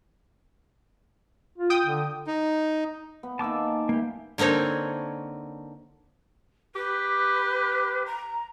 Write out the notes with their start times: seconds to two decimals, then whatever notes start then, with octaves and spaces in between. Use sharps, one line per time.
1.58 F4
1.70 G5 D#6
1.85 D3
2.27 D#4
3.23 B3
3.39 D#3 A#3 G#5 A5 D6 E6
3.89 E3 A#3 G4
4.38 D3 A#3 C4 D#4 C#5
6.75 G4 B4
8.06 A#5